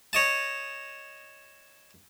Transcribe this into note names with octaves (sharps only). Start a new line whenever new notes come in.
C#5 D#5 A5